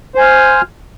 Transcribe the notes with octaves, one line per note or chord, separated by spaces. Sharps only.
C5 F5 G#5